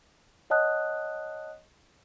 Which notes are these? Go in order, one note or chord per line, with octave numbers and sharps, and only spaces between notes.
C#5 D#5 F#5 A5 D#6 F#6